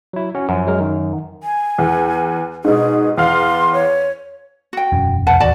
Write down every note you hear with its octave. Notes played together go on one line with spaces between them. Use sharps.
F#3 E4
C#4 F#4
F#2 F3
F#3 G#3 A#4
D#3
G#5
E2
G#2 B2 G#4
E2 F5 C6 F6
C#5
F#4 G5
E1 F#2 C#4
C2 F2 B4 F#5 A5
A1 D#2 F#4 D5 A5